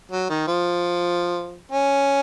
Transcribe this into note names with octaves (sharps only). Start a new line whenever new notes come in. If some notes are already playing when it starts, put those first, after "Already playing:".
F#3
D#3
F3
C#4